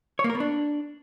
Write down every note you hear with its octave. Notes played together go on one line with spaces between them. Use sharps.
C#5
A#3
A#4
B3
D4